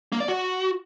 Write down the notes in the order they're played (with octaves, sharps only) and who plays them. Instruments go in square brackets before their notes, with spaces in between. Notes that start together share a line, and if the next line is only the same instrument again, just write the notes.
[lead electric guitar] A#3
D5
F#4